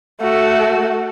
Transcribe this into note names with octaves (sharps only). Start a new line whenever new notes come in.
A3 F#4